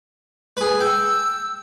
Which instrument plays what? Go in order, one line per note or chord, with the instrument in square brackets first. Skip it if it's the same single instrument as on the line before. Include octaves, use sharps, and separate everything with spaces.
[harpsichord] G#4 B4
[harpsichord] G5 [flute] E6